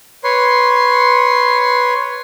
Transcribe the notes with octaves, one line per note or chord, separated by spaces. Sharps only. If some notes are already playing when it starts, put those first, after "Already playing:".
B4 C#5 C6